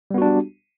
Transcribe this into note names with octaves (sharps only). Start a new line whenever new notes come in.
G3 B3 D4 F#4 G4